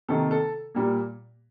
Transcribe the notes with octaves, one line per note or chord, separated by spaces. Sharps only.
C3 D#3 A#3 A4
A4
A#2 G3 A#3